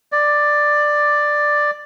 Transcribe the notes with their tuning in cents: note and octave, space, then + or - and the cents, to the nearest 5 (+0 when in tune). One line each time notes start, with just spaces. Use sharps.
D5 +10